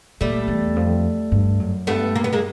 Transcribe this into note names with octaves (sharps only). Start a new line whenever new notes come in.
A#2 G3 A3
E2
F2
G2
F#2
G2 A3 B3
A#3
B3
G#3 A#3